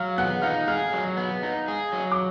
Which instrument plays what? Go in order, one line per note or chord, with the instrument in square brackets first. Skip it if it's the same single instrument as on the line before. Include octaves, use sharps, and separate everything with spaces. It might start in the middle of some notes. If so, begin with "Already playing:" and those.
Already playing: [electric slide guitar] F#3 [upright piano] F5 F6
[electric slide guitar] B3 [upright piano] F#5 F#6
[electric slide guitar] D#4 [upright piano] F5 F6
[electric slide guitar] G#4 [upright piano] F5 F6
[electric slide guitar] F#3
B3
D#4
G#4
F#3
[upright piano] D6